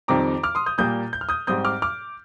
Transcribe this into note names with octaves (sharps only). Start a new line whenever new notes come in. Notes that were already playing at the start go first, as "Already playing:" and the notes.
F2 D#3 G3 C4 A#5 D6
D6 F6
C6 D#6
D#6 G6
A#2 G3 A#3 D#6 G6
G6
F6
D#6 G6
G#2 G3 C4 D#6 G6
D6 F6
D6 F6